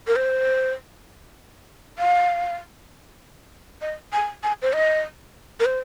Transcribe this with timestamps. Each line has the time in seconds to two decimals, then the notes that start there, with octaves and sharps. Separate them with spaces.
0.07 A#4
0.16 C5
1.99 F5
3.82 D#5
4.13 G#5
4.43 G#5
4.62 C5
4.73 D#5
5.60 A#4
5.65 C5